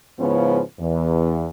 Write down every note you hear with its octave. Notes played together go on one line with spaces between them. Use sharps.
G#2 C#3 F3 B3 C#4 E4
E2